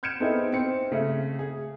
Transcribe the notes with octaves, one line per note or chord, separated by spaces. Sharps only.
F6 G6 G#6 C#7 D7 E7
B3 C4 D#4 E4 G#4 A4
C4 C#7
C#3 A3
G#4